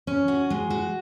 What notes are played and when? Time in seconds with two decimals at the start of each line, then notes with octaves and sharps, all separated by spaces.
0.07 C#4
0.28 F#4
0.50 G#3
0.70 F#4